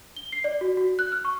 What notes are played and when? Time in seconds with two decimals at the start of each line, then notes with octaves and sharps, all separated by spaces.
0.16 G7
0.32 C7
0.44 D5
0.61 F#4
0.77 F#4
0.99 F#6
1.12 F6
1.25 C#6